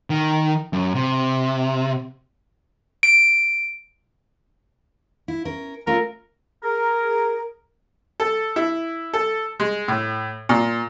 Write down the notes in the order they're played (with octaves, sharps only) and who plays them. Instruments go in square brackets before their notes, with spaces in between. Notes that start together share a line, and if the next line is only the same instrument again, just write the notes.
[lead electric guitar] D#3
F#2
C3
[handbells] D7
[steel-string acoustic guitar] E4
C#4 A#4
[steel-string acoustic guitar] A3 C#4 F4 [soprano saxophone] A#4
[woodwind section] G#4 A#4
[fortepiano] A4
E4
A4
G#3
A2
A#2